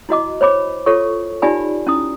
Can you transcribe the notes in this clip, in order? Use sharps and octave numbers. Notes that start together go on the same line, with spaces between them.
E4 F#4 D#5 D6
C5 C#5 B5 D6
F4 A4 C#5 C#6
D#4 F4 G4 D5 G#5 B5
C#4 E4 D#6